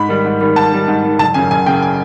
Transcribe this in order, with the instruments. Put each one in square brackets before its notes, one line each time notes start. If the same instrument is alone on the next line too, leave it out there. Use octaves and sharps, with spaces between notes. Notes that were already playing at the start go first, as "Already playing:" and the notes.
Already playing: [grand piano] G#2 B5
D#3 G3
G#2
D#3 G3
G#2 A5
D#3 G3
G#2
D#3 G3
F#1 A5
F#2 C#3 G#5
F#1 G#5
F#2 C#3 G5
G#5